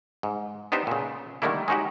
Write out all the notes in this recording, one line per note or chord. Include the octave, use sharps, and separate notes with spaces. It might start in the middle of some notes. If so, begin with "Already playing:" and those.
G#2
B3 D4 D#4 G4 C5 E5
A#2 C#3
D3 D#3 G3 A3 A#3 E4
G#3 C#4 D#4 F#4 G4